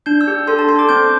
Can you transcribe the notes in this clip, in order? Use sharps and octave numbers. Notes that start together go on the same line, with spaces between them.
D4 G6
E6
G4
A4 C6
A5
D4 C6
D6
C4 G6